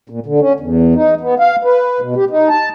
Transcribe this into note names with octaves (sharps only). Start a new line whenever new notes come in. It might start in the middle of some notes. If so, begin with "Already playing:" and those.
A#2
D3
C#4
E2
D#4
B3
F5
B4
B2
G4
D#4
A5